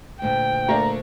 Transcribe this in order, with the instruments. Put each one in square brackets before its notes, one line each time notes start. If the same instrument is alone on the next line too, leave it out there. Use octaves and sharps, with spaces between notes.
[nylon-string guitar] D2 A#2 [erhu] G5
[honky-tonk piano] A3 A#3 D4 [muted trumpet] A#5